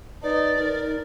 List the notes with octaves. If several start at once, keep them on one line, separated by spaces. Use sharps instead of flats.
D#4 B4 D5
D#4 A#4